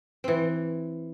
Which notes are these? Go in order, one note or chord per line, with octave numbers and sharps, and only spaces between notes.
E3 C4